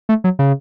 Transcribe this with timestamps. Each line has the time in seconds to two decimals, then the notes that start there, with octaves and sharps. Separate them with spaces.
0.09 A3
0.24 F#3
0.39 C#3